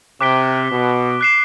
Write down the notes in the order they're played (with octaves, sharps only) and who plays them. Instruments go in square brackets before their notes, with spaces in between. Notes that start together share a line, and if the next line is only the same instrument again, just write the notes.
[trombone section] C3 [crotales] D6 F#6 B6 D7 G7
[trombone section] B2
[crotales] F#6 C7 E7